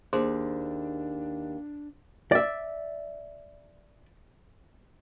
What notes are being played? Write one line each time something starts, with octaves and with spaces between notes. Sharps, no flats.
D#2 D4 G#4 C5 C6
D5 E5